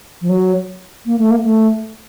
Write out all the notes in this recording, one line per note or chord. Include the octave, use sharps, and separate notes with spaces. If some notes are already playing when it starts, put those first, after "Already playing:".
F3
F#3
A#3
A3
A#3
A3